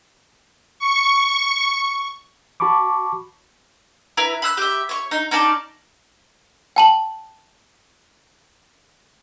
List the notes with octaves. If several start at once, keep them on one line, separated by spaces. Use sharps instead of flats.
C#6
F#4 A5 B5 C#6 D6
E4 B4 A#5
B5 E6 F#6
G4 E5
C#5 C#6
D#4
C#4 D#4 D5 A5
G5 A5 F#7